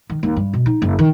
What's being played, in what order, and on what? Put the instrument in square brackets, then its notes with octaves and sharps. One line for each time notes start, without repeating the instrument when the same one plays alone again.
[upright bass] D#3
D#2
G2
B2
D#4
F#1
D#3